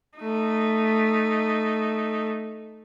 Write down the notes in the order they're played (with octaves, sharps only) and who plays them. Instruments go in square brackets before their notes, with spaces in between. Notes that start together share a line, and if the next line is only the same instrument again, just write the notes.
[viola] A3 D#4